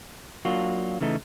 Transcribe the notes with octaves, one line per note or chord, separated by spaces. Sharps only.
F#3 A#3 D4 F4 F#4
C#3 E3 A3 D#4